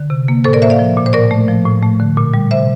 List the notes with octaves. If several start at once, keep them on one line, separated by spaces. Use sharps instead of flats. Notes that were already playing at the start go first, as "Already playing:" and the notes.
Already playing: D3
C3
A#3
A2 A4 C5
A#4 D5
A#3 C5 E5
D5 F5
F3
A#2
C5
A2 A#4 D5
A3
F3
A2
A3
D3
A#2
G3
C3 C5 E5